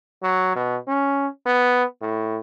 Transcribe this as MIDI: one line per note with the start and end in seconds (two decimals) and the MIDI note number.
0.23 0.51 54
0.56 0.76 47
0.88 1.27 61
1.46 1.83 59
2.01 2.39 45